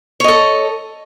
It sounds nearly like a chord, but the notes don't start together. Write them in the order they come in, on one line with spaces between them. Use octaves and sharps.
C#5 D#5 A4